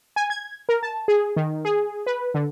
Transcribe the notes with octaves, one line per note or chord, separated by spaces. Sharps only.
G#5
G#6
A#4
A5
G#4
D#3
G#4
B4
D3